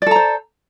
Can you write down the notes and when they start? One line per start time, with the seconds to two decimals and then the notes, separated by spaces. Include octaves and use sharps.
0.02 D5
0.06 A4
0.11 A#5
0.16 C5